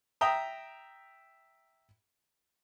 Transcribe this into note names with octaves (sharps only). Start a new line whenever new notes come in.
E5 G5 A#5 D#6